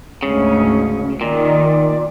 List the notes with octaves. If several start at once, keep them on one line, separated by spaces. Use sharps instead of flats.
D2 G#2 C#3 C#4
A#2 D#3 D5